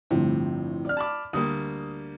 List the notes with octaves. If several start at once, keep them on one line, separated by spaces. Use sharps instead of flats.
G1 A2 C3 F3
D5 F6
A5 B5 D6
D2 G3 A#3 D#6